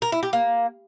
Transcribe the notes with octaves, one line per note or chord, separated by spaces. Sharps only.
A#4
E4
G4
A#3